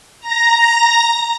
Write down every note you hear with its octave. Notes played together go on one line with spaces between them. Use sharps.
A#5 A#6